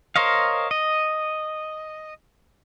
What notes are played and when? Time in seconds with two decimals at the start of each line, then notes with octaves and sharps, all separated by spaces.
0.16 A#4 C5 C#5 D#5 F5
0.71 D#5